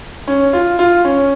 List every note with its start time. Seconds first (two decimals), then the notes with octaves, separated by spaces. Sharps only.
0.28 C#4
0.53 F4
0.79 F4
1.05 C#4